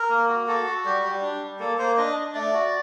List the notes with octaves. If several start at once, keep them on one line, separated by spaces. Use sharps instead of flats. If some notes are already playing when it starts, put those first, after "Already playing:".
Already playing: A#4
A#3
F#4
F#4 A4
F#4
G3 G4
G3 G4
D4
G3
A#3 A4
A#3 C5
D4 D#5
D4
A3 D5
F#4